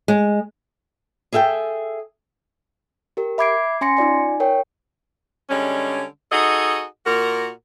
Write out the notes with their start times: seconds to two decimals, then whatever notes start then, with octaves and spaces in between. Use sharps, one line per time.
0.08 G#3
1.32 G#4 A4 E5 F5 G5
3.17 G4 A#4
3.38 E5 B5 D6 G#6 C7 D7
3.81 C#4 G#5 C6 A#6 C#7
3.97 D#4 F4 D5 G#5
4.40 A#4 C#5 G5
5.50 D3 G3 G#3 C#4
6.32 D#4 F#4 G#4 A4 D#5
7.06 A#2 F#4 A#4